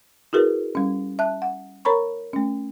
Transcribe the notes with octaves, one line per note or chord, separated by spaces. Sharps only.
E4 F#4 G#4 A#4 B4
G3 C#4
E5 A5 F#6
F#5
A#4 C#5 A#5 B5 C#6
A3 C#4